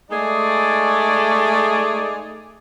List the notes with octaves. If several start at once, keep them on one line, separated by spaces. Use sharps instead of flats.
G#3 A3 D#4 G#4 D5